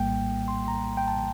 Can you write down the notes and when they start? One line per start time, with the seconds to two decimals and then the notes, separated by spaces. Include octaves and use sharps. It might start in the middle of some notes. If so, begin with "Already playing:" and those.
Already playing: A#1 A2 G3 A#3 G5
0.48 C6
0.68 A#5
0.97 G5
1.08 A5